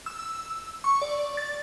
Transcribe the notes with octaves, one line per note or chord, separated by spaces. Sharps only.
E6
C#6
D5
A6